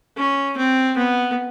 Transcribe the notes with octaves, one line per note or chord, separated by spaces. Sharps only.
C#4
C4
B3